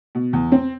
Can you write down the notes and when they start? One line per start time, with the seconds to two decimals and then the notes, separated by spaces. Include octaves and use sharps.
0.15 B2
0.33 E2
0.52 C4